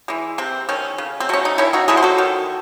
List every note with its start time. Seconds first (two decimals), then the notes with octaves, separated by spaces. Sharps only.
0.08 E3 G#3
0.38 C3 C4
0.69 D#3 A3 C#4
0.98 C#3
1.20 C4
1.29 F#3 A3 C#4
1.45 D#4
1.58 D#3 C#4 E4
1.73 D#4 F#4
1.88 F#3 A3 E4 G#4
1.97 C5
2.03 F#4 A4
2.18 D#3